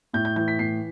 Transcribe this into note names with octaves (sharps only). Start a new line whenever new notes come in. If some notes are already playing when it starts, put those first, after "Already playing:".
A2 G6
G6
E3 G6
B6
A2 C7